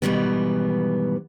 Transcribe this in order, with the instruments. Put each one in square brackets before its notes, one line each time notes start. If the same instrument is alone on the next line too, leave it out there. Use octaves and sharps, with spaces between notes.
[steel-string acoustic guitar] G#2 B2 D#3 E3 G3 B3